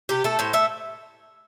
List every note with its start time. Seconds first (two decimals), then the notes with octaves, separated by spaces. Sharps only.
0.09 C3 G4
0.24 A3 A4
0.39 A2 C5
0.53 A3 E5